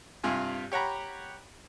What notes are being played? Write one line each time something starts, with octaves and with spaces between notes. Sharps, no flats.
G2 C3 F4 G#5
G4 C#5 F#5 A#5 B5